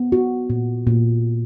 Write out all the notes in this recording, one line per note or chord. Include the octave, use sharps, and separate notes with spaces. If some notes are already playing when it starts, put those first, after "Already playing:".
Already playing: B3
F#4
A#2
A#2